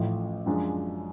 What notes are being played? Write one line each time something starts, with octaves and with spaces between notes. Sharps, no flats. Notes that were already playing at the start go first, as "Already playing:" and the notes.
Already playing: A1 A2 F3
F#2 F3 G#3 D4